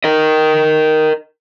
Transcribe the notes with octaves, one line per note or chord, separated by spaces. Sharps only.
A#4 D#5